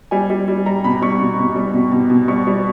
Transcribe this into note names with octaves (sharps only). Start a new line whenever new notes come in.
G3 G#5
G3
G3
G3 A#5
B2 B5
G3 C#6
B2
B2
G3
B2
B2
B2
G3 C#6
G3